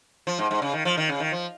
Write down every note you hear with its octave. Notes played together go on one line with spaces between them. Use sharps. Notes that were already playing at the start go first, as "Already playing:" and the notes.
F3
G#2
G#2
C#3
D#3
F3
D#3
C#3
D#3
F3